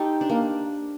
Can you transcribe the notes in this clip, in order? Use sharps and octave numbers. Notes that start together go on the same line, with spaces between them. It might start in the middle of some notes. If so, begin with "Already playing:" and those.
Already playing: D#4 G4 A4 C5
D4
A#3